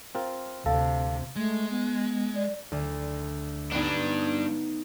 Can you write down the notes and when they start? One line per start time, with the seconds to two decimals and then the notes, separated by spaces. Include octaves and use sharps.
0.15 C4 F4 A#4
0.66 D2 C3 A4 F5
1.36 G#3 A3
1.71 B3
2.35 D5
2.72 D2
3.72 G2 B3 D4 D#4